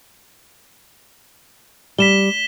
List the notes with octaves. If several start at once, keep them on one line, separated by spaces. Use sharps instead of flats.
G3 B6 E7 G7